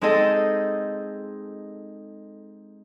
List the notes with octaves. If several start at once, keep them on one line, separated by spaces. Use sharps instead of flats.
G#3 C4 D#4 G#4 A4 D#5